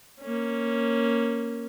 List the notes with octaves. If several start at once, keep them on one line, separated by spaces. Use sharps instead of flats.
A#3 C#4